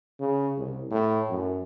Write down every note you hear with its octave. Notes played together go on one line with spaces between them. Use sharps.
C#3
C2
A2
F#2